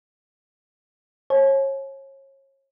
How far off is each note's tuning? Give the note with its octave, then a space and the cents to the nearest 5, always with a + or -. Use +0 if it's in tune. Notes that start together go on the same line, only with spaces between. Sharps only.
C#5 -35 A5 -45